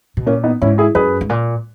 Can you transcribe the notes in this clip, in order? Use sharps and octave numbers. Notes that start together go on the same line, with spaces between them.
B2
A#2 A#3 C#4
B3 D#4
G#2 C#4 E4
E4 G#4
F#2 G#4 B4
G#2
A#2